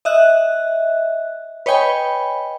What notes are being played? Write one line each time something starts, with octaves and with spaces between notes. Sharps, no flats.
D#5 E5 F#6
B4 C#5 D#5 G5 G#5 B5